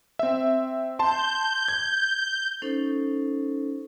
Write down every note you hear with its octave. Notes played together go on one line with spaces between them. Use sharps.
C4 E5
A5 C6 G6
G#6
C#4 D#4 A4 C5